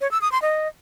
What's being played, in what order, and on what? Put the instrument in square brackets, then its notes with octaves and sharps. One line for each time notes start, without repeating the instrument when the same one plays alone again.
[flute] C#5
E6
D#6
C6
D#5